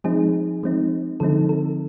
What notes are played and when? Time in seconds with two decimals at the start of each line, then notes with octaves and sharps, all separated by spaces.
0.04 F3 G#3 C4 D#4 G#4
0.63 F3 G#3 C4 D#4
1.20 D3 F3 G#3 C4 D#4 A4
1.49 A4